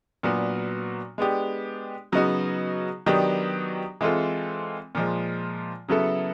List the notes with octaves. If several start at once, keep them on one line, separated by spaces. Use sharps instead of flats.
A#2 F#3 B3 D4 F#4
G#3 B3 D4 G4
C#3 F#3 B3 D#4 F#4
D#3 F#3 B3 D4 G4
E3 G#3 C4 F4 A4
A#2 F3 G#3
C#3 F#3 B3 E4 A4